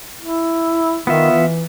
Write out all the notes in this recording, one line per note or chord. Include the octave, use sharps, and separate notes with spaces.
E4
D#3 B3 F4 E5
E3